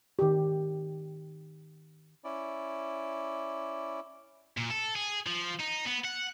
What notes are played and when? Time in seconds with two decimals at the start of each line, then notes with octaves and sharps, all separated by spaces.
0.19 D#3 G4
2.24 C#4 E4 D5
4.57 A#2
4.70 A4
4.95 G#4
5.27 F3
5.60 D#4
5.87 B3
6.05 F#5